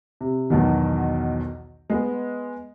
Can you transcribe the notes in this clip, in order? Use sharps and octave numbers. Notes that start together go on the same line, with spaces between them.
C3
B1 E2 B2 D#3
G#3 B3